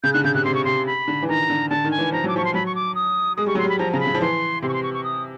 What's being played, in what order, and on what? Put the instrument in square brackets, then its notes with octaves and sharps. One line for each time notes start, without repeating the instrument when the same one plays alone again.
[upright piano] C#3 [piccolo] G6
[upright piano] D3 [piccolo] F#6
[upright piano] C#3 [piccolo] G6
[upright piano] C3 [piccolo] F#6
[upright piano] C3 [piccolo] C6
[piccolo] C#6
[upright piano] C3 [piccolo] C6
[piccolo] B5
[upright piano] D3
E3
[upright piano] D#3 [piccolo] A#5
[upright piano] D3
[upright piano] D3 [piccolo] A5
[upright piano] D#3
[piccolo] G#5
[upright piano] E3
[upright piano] F3 [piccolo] A#5
[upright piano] F#3 [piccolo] D6
[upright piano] F3 [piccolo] C#6
[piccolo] C6
[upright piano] F#3 [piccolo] B5
[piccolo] C#6
D6
D#6
[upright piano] G#3 [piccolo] D#6
[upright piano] G3 [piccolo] C#6
[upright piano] F#3 [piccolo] C6
[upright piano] G3
[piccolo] B5
[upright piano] F3 [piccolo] A#5
[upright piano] C#3 [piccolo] A#5
[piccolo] B5
[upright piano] C#3
F3
[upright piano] E3 [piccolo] C6
[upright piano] C3 [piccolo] C6
[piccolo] C#6
C6
C#6
C#6
D#6